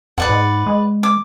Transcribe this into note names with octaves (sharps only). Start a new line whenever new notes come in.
F2 B4 D5 F#5
G#2
G#3
D6